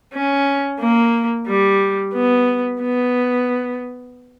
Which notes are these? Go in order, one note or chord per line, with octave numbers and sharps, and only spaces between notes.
C#4
A#3
G3
B3
B3